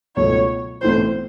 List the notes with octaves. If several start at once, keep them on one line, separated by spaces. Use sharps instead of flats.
C#2 B2 F#3 A3 C#5
B1 A2 E3 A3 C4 C5